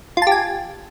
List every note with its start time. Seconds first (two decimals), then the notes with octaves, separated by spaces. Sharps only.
0.17 F4
0.22 A5
0.27 G4
0.32 G#5